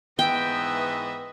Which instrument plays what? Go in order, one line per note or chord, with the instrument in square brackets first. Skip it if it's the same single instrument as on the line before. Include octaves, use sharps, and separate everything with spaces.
[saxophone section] G#2 E3 B3 [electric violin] D#5 E5 [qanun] G5